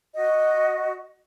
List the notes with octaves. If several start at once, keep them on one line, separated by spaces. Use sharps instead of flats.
F#4 D#5